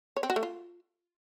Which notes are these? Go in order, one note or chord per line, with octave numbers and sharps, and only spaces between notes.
C#5
C4
F#4
A3
F4